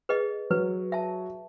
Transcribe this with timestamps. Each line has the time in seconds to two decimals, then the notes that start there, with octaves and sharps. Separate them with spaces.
0.09 G#4 B4 D#5
0.50 F#3 B4
0.92 E5 A5